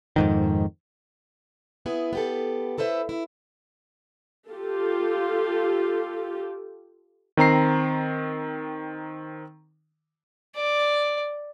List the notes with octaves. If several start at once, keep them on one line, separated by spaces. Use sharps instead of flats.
F2 G#2 D#3
B3 E4 G#4
B3 G4 A4
E4 A4 B4 C5 E5
E4
F4 G4 A4
D#3 C4 A#5 C7
D5